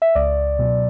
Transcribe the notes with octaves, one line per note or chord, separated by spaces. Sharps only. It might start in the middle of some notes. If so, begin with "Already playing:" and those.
E5
C#2 D5
B2 F#3